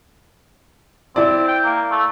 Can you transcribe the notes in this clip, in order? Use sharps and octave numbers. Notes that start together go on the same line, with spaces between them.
C4 E4 D5
G5
A#3
A3